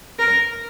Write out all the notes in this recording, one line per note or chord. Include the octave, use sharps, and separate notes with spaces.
A#4